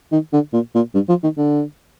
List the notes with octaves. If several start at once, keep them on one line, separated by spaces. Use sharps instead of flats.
D#3
D3
A#2
A#2
G2
F3
D#3
D3